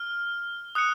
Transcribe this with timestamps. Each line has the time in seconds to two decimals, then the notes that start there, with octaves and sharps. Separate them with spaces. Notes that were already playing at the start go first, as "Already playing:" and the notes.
Already playing: F6
0.75 D#6 F#6 C#7